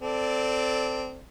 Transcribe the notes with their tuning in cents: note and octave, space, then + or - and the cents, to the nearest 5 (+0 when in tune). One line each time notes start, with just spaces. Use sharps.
C4 -15 A4 +0 D5 +0